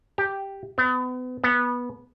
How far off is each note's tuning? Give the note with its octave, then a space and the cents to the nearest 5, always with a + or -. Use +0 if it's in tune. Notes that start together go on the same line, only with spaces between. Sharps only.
G4 +0
B3 +35
B3 -15